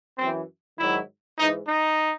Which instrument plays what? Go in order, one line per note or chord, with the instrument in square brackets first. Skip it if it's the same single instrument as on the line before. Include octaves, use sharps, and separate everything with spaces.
[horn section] F#2 E3 C4
G#2 D#3 F#3 E4
G#2 E3 D#4
D#4